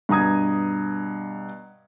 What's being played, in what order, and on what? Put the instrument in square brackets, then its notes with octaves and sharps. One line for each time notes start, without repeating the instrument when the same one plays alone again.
[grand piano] G2 B2 A#5 D#6 G#6